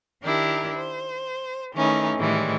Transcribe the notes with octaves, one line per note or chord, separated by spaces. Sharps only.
D#3 D4 E4 G4 A#4
C5
D#3 E3 A3 C#4 D#4
A2 D#3 E3 G3 G#3